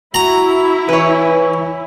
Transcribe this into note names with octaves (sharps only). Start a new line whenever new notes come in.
E4 F#4 A#5
E3 B4 C#5